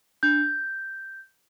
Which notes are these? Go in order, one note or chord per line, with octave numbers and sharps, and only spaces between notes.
D4 G6